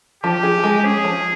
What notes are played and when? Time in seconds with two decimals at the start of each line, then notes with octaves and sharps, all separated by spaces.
0.23 F3 G4
0.43 G#4
0.64 G#3
0.84 C#4 G#4
1.04 F3